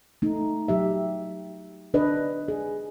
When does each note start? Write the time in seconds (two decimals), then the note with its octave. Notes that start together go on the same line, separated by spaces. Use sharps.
0.22 A3 D#4
0.68 F#3 G4 E5
1.94 D4 B4 D5 D#5
2.48 G#4